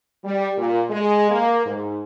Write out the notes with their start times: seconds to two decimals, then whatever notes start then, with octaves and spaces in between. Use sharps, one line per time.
0.24 G3
0.57 A#2
0.90 G#3
1.30 A#3
1.66 G#2